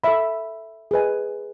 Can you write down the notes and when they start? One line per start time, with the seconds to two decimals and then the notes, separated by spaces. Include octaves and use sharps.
0.04 A4 E5 B5
0.91 G#4 B4 D#5 G#5